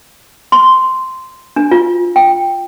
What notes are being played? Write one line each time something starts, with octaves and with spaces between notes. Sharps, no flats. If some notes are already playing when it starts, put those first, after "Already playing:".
C6
D4
F4
G5